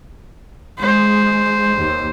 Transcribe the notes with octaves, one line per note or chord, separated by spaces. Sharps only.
G#3 C5
D#2